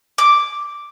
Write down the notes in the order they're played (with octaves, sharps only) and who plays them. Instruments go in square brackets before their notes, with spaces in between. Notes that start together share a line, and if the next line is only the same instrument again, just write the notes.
[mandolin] D6